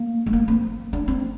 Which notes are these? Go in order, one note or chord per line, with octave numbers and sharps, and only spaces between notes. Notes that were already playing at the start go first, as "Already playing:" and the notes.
Already playing: A#3
G#3
A#3
C4
D4
C4